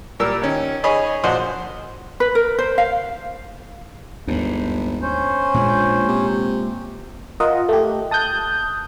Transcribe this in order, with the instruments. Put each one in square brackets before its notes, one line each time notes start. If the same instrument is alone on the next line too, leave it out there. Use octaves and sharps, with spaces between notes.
[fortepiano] A#2 G3 A#4 E6
D#3 C#4
D#4 G#4 C#5 D#5 G#5 B5
A#1 D4 F#4 C5 D#5 C6
[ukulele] B4
A#4
C5
F5
[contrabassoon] G1 [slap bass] D#2 G#2
[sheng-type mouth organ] C#4 C5
[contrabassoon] A#1 [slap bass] A#2 G#3
[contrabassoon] C3
[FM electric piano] F4 A#4 D#5 F#5
A3 G4
A5 D#6 F#6 G6